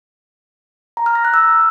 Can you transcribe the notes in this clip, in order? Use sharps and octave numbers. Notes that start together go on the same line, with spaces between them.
A#5
F6
A#6
F#6
E6